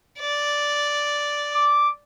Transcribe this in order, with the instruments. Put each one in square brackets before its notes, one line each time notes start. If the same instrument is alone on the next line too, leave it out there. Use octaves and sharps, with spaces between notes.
[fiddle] D5
[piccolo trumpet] D6